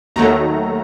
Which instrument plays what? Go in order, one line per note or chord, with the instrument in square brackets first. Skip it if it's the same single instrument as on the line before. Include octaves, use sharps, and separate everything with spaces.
[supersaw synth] D#2 D#3 F#3 A3 A#5